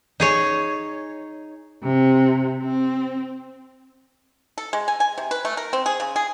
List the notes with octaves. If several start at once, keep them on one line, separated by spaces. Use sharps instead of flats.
D#4 G#4 C#5
C3
C4
A4
G#3
G#5
G#5
C3
B4
A3
A#4
C4
G#4
C#3
G#4